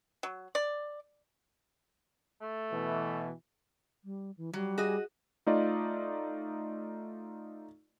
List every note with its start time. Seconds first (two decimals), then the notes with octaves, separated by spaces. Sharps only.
0.23 F#3
0.55 D5
2.41 A3
2.73 B2 E3
4.04 G3
4.37 E3
4.53 F#3 G3
4.78 F#4 G#4 D#5
5.46 A3 D#4 F4 D5 D#5